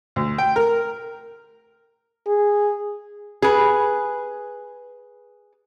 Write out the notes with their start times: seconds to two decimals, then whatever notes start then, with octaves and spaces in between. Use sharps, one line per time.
0.16 D2
0.38 G5
0.56 A#4
2.27 G#4
3.42 G#4 B4